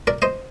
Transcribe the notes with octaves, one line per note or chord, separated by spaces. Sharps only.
A#4 D5
C5 D#5